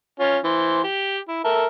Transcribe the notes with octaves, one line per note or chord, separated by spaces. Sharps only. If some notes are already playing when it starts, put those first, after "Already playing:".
C#4 F4
E3 C5
G4
E4
A4 A#4 E5